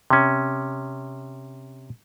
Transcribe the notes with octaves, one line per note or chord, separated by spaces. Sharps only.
C3 C#4